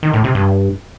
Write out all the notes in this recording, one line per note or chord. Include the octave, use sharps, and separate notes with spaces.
D#3
A2
C3
G2